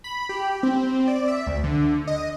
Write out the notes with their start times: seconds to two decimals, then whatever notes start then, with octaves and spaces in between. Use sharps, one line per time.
0.04 B5
0.29 G4
0.63 C4
1.08 D5
1.28 E5
1.47 D2
1.64 D3
2.07 D#5